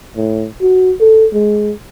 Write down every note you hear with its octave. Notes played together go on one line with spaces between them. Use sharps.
A2
F#4
A4
G#3